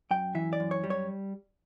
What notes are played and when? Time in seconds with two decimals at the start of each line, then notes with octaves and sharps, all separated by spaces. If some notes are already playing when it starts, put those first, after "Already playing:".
0.11 F#2 G5
0.35 E3 E5
0.53 D5
0.60 F#2
0.71 C#5
0.84 G3
0.90 C#5